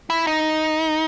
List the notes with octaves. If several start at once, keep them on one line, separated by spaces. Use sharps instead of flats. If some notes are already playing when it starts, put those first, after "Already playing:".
E4
D#4